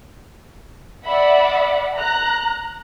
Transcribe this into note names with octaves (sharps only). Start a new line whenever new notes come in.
D5 E5 F#5 B5
A#5 F#6